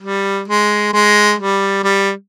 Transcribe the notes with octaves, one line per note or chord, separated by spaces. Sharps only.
G3
G#3
G#3
G3
G3